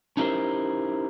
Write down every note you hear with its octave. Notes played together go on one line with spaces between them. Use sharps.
C#4 D#4 E4 G4 A#4 C5